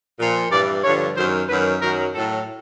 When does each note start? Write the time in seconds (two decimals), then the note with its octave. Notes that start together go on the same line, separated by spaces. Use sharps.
0.19 A#2 F3
0.51 G2 E3 D5
0.84 G2 D3 F3 C#5
1.16 F#2 D#3 F#3 C5
1.49 F#2 D#3 F#3 B4
1.81 F#2 D#3 F#3 A#4
2.15 A2 F#3 A4